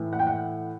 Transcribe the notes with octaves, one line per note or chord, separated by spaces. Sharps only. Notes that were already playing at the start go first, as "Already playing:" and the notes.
Already playing: A2 E3
F#5
G5
F#5